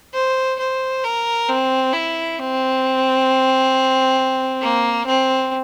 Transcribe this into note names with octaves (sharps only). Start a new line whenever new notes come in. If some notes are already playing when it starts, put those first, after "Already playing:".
C5
C5
A#4
C4
E4
C4
A#3
C4